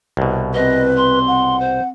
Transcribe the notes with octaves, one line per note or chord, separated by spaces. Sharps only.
C2 B2
C4 B4 D#5
C6
F#5
C5